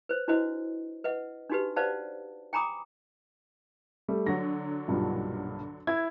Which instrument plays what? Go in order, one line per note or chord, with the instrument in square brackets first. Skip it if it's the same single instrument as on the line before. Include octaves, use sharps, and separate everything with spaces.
[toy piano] B4 C5
D4 E4 F#4 B4 C5 D#5
B4 D#5 F#5
D4 D#4 F#4 G4 B4
B4 C5 D5 F5 F#5 A5
G5 G#5 A#5 B5 D6 D#6
[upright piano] G3 A3
[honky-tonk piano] D3 F#3 [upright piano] A#6
[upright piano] B1 G2 A#2
[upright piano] E4 [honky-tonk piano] G#6